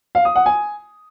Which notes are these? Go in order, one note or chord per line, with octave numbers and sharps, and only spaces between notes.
F5
D#6
F#5
G#5